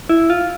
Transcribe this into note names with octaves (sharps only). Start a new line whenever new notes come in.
E4
F4